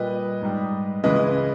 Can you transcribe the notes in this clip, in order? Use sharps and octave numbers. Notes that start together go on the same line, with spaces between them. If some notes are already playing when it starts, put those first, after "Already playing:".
Already playing: A#2 G3 B4 D#5
G#2 G3
C#2 C#3 E3 G#3 B4 D#5